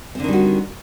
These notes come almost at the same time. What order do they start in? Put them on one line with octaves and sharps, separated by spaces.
C4 D3 D#3 G3 F#4